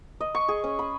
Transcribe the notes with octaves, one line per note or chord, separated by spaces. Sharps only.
D#5
C#6
G#4
C#4
B5